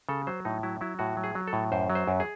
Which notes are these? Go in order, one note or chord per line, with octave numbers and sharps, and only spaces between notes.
C#3 A4
F#3 C5
A2 D#4
F#3 E4
F#3 E4
A2 F#4
F#3
G#4
F#3
A4
A2
F#2 C5
F#3
C5
F#2
G#4